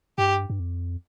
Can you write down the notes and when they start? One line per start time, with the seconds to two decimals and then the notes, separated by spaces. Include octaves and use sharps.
0.18 G2 G4
0.50 G2
0.60 F2